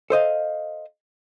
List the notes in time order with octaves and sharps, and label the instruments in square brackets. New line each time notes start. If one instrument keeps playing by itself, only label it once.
[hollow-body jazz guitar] A4 C5 D#5 F5